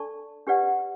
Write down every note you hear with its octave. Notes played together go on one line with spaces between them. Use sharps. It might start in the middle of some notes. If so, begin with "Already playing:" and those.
Already playing: D4 A4 D5 A5 C#6
D4 G4 B4 D5 F#5